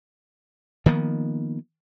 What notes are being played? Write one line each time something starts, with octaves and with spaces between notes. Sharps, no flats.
D#3 F3 A#3 B3